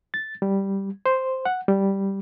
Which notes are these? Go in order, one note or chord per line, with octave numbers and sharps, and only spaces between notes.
A6
G3
C5
F#5
G3